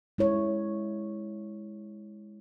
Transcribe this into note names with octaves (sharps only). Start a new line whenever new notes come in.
G#3 E4 C#5